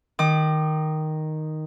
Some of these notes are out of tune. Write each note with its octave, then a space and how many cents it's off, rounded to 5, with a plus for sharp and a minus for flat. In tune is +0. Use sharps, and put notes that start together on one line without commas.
D#3 +0 D6 +35